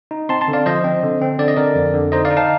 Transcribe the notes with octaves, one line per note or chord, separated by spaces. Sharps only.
D#4
C4 A5 C6
A5 C6
D3
D5 F5
F3 C5 D#5
C4
D3
C4
D3 D5
D#5
D3 A#4 D5
F2
D3
D#4 C5 D#5
D5 F5
D#4
F5 A5